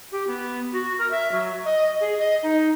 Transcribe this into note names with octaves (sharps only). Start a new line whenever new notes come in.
G4
B3
F#4
A#4
E5
F#3
D#5
G#4
D#5
D#4